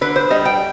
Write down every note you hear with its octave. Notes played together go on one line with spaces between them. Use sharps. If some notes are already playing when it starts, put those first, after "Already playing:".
D3 B4
C5
G3 D#5
G5